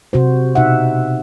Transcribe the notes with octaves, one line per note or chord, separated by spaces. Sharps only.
C3 F#4 C5
B2 D#4 E5 F#5